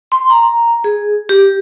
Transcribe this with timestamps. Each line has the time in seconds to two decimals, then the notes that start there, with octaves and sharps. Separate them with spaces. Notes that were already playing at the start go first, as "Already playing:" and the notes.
0.12 C6
0.30 A#5
0.84 G#4
1.29 G4